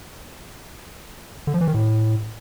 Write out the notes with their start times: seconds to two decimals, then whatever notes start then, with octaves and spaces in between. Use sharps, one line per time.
1.47 D3
1.54 F3
1.61 E3
1.68 D#3
1.74 A2